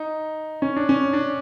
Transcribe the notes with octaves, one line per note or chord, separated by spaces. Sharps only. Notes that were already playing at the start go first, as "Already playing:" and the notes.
Already playing: D#4
C#4
D4
C#4
D4